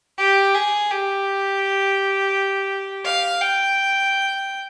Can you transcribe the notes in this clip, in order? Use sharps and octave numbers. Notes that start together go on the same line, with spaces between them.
G4
G#4
G4
F5
G5